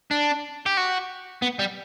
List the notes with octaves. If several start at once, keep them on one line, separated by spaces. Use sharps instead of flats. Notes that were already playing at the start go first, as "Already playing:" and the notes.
D4
G4
F#4
B3
G3